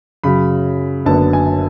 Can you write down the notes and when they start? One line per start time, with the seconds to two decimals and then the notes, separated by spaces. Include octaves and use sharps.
0.24 F#2 C#3 F#3 B5
1.05 F#1 F#2 D3 F#3 B3 A5
1.33 G#5